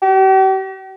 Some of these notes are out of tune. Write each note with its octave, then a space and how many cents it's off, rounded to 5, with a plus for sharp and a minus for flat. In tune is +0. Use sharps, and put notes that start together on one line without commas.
G4 -45